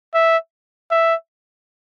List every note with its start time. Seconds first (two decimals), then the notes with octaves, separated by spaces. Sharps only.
0.14 E5
0.91 E5